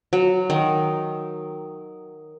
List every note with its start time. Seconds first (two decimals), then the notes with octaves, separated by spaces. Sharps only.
0.13 F#3
0.50 D#3